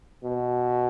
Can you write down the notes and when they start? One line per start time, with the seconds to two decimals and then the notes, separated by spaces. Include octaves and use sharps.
0.23 B2